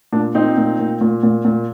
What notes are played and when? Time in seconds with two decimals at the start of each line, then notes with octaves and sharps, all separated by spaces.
0.12 A#2 D4
0.35 A#2 C4 D#4
0.57 A#2
0.79 A#2
1.01 A#2
1.23 A#2
1.45 A#2